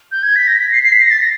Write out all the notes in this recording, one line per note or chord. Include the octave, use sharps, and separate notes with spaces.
G6
G#6
B6
A#6
B6
C7
C7
B6
A#6
A6
A#6